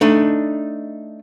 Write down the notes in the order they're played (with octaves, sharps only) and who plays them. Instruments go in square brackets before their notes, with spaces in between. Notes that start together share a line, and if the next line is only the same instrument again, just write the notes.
[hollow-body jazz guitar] A3 D4 D#4